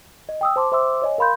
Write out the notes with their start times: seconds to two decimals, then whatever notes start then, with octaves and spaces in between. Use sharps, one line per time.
0.29 D#5
0.41 G5 D#6 E6
0.56 C5 A5 C6 D6
0.72 C5 E5 G5 C6 D6 E6
1.02 C#5 D#5 G#5
1.18 A#4 F5 B5 C6 G6